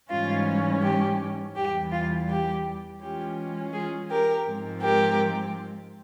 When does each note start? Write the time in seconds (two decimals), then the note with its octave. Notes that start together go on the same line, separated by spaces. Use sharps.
0.11 G#2 E3 G3 C#4 F4
0.83 G4
1.55 E2 E3 G3 G4
1.92 F4
2.29 G4
3.01 E3 G#3 C#4 F4 G4
3.73 F4 G#4
4.10 G4 A#4
4.46 G#2 F3 G#3 C4
4.83 G4 A#4